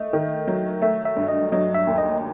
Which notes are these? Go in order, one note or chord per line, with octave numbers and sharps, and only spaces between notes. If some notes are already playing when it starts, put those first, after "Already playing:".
Already playing: A3 D#5
D#3
F#3
A3 E5
E5
G2
D#5
F#3 D#5
E5
D#2
D#5